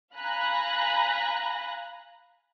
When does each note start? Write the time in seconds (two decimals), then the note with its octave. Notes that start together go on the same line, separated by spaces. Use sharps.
0.17 F5 G#5 A#5 B5 F#6 A#6